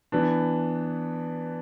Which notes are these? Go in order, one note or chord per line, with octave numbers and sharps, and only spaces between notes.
E3 B3 D4